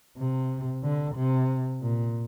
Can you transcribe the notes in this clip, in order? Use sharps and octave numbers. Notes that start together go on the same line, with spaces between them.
C3
D3
C3
A#2